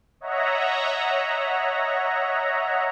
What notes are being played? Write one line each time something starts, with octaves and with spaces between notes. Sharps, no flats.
C#5 D#5 E5 F#5 A#5